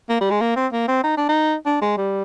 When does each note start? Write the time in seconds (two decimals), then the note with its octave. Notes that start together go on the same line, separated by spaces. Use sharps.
0.09 A#3
0.21 G3
0.31 G#3
0.41 A#3
0.56 C4
0.72 A#3
0.88 C4
1.03 D#4
1.17 D4
1.29 D#4
1.66 D4
1.81 G#3
1.97 G3